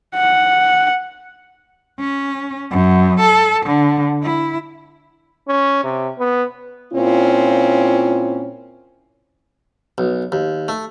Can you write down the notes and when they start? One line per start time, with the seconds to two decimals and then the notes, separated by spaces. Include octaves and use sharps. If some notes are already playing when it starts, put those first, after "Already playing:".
0.15 F#5
2.00 C#4
2.71 F#2
3.20 A4
3.66 D3
4.23 E4
5.48 C#4
5.84 C3
6.19 B3
6.93 A#2 C4 C#4 E4 F4
9.98 B1
10.32 D#2
10.68 A3